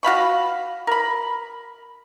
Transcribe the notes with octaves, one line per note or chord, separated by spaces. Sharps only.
F#4 F5 B5 C#6
A#4 B5